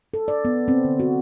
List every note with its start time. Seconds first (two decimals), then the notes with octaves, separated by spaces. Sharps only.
0.14 A4
0.28 D5
0.45 B3
0.68 C4
0.84 D3
1.00 F#4